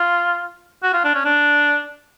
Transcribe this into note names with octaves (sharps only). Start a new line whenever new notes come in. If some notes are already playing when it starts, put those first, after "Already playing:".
Already playing: F4
F#4
F4
D4
C#4
D4